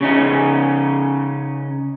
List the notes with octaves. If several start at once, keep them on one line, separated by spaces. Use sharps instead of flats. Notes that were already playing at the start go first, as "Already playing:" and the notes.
C#3 C#4 D#4